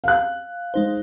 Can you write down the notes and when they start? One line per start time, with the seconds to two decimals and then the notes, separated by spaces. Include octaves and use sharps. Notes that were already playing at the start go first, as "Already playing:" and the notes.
0.04 F5 F#6
0.74 G#3 D#4 C5